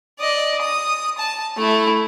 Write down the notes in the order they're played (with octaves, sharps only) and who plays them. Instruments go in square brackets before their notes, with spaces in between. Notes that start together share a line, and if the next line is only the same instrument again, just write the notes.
[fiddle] D5 D#5
D#6
A5
A3 E4